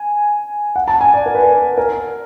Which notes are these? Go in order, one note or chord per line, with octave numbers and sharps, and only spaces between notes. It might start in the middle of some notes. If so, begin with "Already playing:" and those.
Already playing: G#5
F#5
A5
G#5
D5
A#4
B4
A#4
A#4